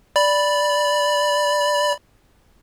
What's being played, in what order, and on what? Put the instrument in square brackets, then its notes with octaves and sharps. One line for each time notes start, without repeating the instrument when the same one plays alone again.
[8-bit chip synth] D5 B5